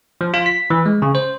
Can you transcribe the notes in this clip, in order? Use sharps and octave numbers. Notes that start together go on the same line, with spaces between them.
F3
F4
B6
E3
G#3
C#3
C5